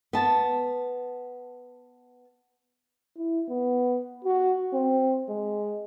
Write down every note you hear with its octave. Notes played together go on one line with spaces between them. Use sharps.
B3 A5
E4
B3
F#4
C4
G#3